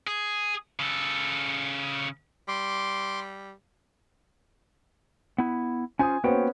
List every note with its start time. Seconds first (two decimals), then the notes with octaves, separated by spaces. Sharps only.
0.07 G#4
0.79 C#3 A4
2.48 G3 C6 D6
5.38 B3 E4
5.99 C#4 F4 C5 G#5 D#6
6.24 A#3 B3 C#4 F#4 C5 G5